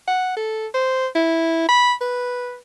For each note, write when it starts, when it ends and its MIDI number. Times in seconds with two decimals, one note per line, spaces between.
0.08 0.35 78
0.37 0.67 69
0.74 1.07 72
1.15 1.66 64
1.69 1.93 83
2.01 2.58 71